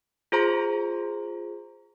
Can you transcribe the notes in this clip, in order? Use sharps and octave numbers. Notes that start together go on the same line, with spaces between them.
F4 G#4 C5 A#5 C6